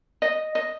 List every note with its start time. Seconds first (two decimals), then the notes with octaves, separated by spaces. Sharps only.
0.22 D#5
0.55 D#5